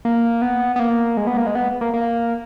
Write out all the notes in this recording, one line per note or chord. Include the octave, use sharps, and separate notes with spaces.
A#3
B3
B3
A#3
G#3
B3
A#3
G#3
B3
A#3
A#3